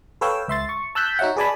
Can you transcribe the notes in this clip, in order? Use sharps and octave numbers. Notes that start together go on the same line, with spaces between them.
A4 B4 C#5 F5 G5 E6
C#2 E5 C6 A6
C#6
A5 E6 F#6 G6 B6
D#4 F#4 C#5 E5 F#5
G#4 B4 D5 G#5 A5 B5